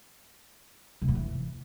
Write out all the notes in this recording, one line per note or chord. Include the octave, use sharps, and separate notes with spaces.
C3
G2
E3